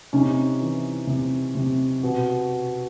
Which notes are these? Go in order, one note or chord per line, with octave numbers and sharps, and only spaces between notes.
C3 C#4 D#4
E3
C3
C3
B2